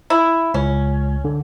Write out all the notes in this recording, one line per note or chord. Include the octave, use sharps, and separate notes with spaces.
E4
C#2 C#4
D3